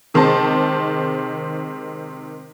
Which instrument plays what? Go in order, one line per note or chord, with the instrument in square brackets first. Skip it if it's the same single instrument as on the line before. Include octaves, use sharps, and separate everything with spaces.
[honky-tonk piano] C3 D#3 G#3 C5 A5